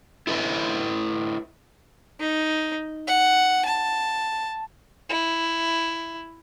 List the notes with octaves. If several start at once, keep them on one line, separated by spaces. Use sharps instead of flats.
E4 A4 B4 D#5 E5
D#4
F#5
A5
E4